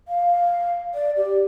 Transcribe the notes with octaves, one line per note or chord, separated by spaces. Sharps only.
F5
D5
G4